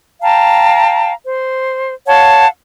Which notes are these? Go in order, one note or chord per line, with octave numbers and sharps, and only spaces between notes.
F5 G5 A5 A#5
C5
C#5 F5 F#5 A5